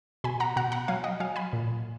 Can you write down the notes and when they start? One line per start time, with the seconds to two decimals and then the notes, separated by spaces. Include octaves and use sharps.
0.24 B2 G#5 B5
0.40 F#5 A#5
0.56 B2 F#5 A#5
0.72 F#5 A#5
0.88 F#3 F5 G#5
1.04 D#5 F#5
1.20 F#3 F5 G#5
1.36 G#5 B5
1.53 A#2